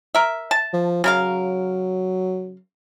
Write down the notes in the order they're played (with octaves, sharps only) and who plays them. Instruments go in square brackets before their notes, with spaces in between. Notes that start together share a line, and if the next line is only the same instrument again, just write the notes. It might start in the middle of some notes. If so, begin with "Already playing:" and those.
[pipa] A#4 E5
A5
[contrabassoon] F3
[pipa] C#3 A#4 F5 [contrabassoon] F#3